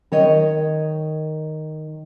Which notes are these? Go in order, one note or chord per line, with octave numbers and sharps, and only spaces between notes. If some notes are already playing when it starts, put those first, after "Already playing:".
D#3 C#5 D#5